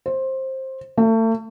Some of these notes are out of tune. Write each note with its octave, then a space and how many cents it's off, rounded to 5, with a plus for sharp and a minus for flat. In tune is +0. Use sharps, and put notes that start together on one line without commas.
C5 +15
A3 +35